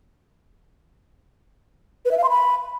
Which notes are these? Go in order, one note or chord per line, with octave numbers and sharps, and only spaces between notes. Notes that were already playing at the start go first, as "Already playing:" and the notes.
B4
E5
F5
C6
B5